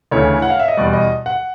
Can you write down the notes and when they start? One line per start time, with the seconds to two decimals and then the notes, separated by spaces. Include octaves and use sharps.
0.11 D2 C#3 E3 A3 C#5
0.42 F#5
0.50 F5
0.60 E5
0.68 D#5
0.77 E2 B2 G3 D5
0.93 D#5
1.26 F#5